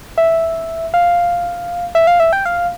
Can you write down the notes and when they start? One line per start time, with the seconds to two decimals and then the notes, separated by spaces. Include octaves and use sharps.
0.18 E5
0.94 F5
1.95 E5
2.07 F5
2.20 E5
2.33 G5
2.46 F5